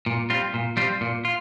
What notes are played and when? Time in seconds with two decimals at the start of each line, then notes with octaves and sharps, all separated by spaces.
0.06 A#2
0.30 G3 C4 F4
0.54 A#2
0.77 G3 C4 F4
1.01 A#2
1.25 F4